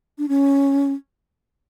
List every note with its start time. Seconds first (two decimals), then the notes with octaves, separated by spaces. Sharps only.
0.18 D4
0.28 C#4